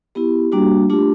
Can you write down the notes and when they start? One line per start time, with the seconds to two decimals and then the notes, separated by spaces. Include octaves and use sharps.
0.15 B3 E4 G4
0.52 G3 A#3 D4 F#4
0.90 A3 D4 F4 G4